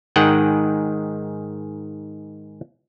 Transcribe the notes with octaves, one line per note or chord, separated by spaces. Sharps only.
G#2 D#3 G#3 G#4 F#5 G5